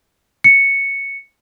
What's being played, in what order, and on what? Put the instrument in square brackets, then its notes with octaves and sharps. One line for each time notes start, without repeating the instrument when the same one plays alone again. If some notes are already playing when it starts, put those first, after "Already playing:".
[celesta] C#7